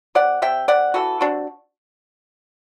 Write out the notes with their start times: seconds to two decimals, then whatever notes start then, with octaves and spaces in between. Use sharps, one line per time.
0.15 C3 D5 F#5
0.42 C3 E5 G5
0.68 C3 D5 F#5
0.94 E3 F#4 A4
1.21 C3 D4 F#4